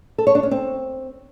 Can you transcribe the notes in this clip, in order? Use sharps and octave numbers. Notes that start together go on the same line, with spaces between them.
A4
C#5
D4
C#4
C4